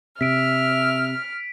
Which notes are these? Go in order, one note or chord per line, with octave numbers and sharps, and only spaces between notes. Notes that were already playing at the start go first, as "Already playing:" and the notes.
C3 E5 F6 B6 D7